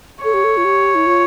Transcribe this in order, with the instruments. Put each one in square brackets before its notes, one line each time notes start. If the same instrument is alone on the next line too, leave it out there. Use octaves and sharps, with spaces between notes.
[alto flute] A4 [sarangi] C#5
[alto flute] G4
A4
F4
G4
E4
F4